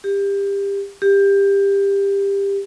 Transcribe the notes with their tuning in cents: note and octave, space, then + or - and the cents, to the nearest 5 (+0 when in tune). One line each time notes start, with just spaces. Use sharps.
G4 +25
G4 +20